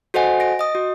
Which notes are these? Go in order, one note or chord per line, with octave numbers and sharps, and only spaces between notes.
F#4 A4 C5 D#5 F#5 G#5
A#6 D7
D#5 D#6
F#4